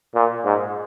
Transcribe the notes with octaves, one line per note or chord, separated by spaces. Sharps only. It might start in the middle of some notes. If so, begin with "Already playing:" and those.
A#2
G#2